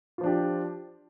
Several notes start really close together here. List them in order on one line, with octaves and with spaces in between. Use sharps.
F4 F3 D4 G4